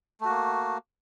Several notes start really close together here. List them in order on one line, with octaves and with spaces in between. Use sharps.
A3 F#4 A#3